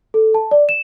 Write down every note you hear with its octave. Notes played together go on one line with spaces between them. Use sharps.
A4
A5
D5
E7